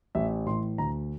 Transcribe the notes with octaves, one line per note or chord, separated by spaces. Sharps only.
A1 E5
A2 E3 C6
D2 A#5